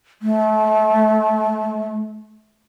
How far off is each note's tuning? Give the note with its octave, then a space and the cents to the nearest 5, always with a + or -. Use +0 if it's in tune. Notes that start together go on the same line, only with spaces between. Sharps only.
A3 -30